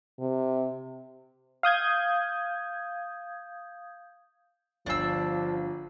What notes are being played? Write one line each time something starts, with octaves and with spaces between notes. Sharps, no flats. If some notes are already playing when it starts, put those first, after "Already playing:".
C3
F5 D#6 G6 G#6
G1 F3 D4 E6 C7